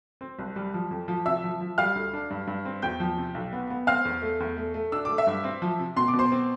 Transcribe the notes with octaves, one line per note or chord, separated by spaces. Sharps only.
C4
C2
G3
F3
F2
F3
C3 E5 E6
F3
F3
G3 F5 F6
D2
D4
G2
G2
C4
E2 G5 G6
F3
C3
B1
B3
B3
C4 F5 F6
E2
A3
E2
A3
A3
D4 E6
A3 D6
E5 E6
G2
C4
F3
C3
B2 C6
D6
B2
C5 C6
C4